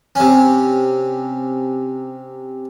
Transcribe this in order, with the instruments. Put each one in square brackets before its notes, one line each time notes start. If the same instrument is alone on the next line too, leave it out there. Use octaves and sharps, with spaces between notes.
[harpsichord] C3 C#4